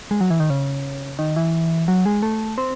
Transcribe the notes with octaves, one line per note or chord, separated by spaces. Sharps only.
G#3
F#3
E3
D#3
C#3
D#3
E3
F#3
G#3
A3
C4